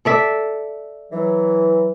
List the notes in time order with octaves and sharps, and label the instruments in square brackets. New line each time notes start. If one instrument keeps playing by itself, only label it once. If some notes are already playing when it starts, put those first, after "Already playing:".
[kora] A4 D5 E5
[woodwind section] E3 F#3